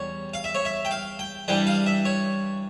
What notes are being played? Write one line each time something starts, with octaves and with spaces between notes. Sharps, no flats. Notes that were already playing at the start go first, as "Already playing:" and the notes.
Already playing: E2 G3 C#5
F5
E5
C#5
E5
G5
F5
G5
G2 E3 G3 G5
F5
E5
C#5